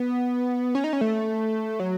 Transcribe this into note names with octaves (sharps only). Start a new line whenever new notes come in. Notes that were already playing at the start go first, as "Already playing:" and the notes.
Already playing: B3
C#4
D#4
C#4
A3
F#3